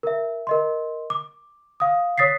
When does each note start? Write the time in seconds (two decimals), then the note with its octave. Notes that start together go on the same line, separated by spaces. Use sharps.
0.03 A#4 E5
0.47 A#4 D#5 C6
1.10 D6
1.80 F5 D#6
2.18 C#5 D#6 A6 B6 C7